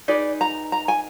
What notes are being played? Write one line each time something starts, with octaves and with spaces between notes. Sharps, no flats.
D#4 G#4 B4 D5
A#5
A#5
G#5